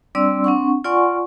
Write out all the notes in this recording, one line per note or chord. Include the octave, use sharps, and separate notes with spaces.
G3 C4 D4 D5 C6 E6
C4 D4 F#5 C#6
F4 D5 F#5 G#5 C6 C#6